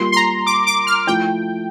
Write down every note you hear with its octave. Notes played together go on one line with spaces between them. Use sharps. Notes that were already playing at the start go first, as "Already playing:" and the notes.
Already playing: G3 A#3 F4 C6
C6
A#5
D6
D6
F6
F3 A3 E4 G5